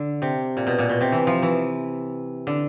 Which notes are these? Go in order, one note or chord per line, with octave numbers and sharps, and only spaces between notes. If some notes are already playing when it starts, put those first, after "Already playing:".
Already playing: D3
C3
A#2
B2
A#2
B2
C3
E3
F3
E3
D3